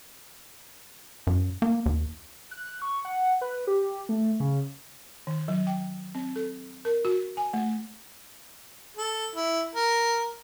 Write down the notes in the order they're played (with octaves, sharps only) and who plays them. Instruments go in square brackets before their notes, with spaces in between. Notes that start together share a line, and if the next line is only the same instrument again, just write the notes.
[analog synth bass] F#2
A#3
D#2
[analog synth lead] F#6
C#6
F#5
B4
G4
A3
C#3
[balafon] D#3
F#3
G5
C4
A4
A#4
F#4
G#5
A3
[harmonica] A4
E4
A#4